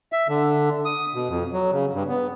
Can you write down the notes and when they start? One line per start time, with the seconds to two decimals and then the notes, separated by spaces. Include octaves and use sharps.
0.12 E5
0.28 D3
0.85 D#6
1.14 B2
1.28 F2
1.52 F#3
1.72 C#3
1.94 G2
2.08 B3